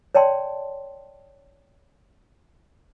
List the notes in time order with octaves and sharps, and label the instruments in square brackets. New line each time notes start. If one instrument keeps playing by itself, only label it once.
[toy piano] C#5 D5 G5 A5 C6